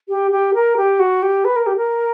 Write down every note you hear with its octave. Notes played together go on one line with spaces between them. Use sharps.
G4
G4
A#4
G4
F#4
G4
B4
A#4
G4
A#4